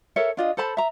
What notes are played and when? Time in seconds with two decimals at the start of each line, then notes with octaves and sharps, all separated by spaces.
0.16 A4 A#4 C#5 E5
0.37 D4 F4 D#5
0.57 A4 C5 A5 B5
0.77 E5 A#5